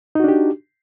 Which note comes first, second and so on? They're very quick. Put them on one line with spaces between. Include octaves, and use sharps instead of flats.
D#4 F#4 D4 G4